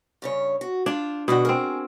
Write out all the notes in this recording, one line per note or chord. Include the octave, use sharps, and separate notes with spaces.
G2 C#3 C#5
F#4
D4 F4 C5
B2 D3 F#4 A4 D5
C4 G#4 A#4